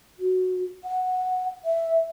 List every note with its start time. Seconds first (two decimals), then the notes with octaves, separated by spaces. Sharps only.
0.19 F#4
0.84 F#5
1.64 E5